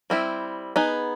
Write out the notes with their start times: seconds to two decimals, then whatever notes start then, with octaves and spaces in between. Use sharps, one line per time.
0.10 G3 C4 E4
0.76 B3 D#4 G#4